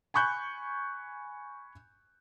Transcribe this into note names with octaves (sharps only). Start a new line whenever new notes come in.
G#5 B5 C#6 F#6 G6